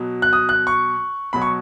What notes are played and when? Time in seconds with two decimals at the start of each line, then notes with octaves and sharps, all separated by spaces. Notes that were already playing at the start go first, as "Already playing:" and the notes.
Already playing: B2 F#3
0.22 F#6
0.33 D#6
0.49 F#6
0.67 C#6
1.33 B2 F#3 B5
1.42 C#6